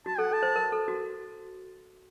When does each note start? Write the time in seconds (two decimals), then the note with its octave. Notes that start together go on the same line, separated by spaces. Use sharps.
0.06 F#4 A5
0.19 A4 F#5
0.31 A4 A5
0.43 C5
0.56 A#4
0.72 A4
0.88 F#4